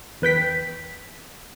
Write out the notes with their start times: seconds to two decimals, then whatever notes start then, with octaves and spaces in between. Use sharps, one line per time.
0.22 E2 B4 G5 B6